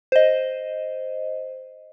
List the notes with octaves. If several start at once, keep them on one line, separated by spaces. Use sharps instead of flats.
C5 D#5